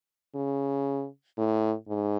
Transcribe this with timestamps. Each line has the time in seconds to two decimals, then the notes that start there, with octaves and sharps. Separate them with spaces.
0.35 C#3
1.38 A2
1.89 G#2